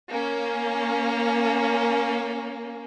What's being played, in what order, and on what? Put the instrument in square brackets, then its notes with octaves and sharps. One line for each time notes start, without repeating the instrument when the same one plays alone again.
[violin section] A#3 C#4